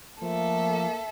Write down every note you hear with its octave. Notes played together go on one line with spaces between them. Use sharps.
F3 A3 A#3 A4 E5